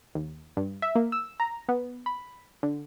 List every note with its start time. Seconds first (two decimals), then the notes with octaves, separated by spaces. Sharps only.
0.15 D#2
0.57 G2
0.82 E5
0.95 A#3
1.12 E6
1.40 A#5
1.69 B3
2.06 B5
2.63 D3